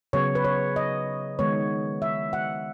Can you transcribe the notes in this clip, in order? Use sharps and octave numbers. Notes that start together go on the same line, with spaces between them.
C#3 F#3 B3 C#5
B4
C#5
D#5
D#3 G#3 B3 C#5
E5
F#5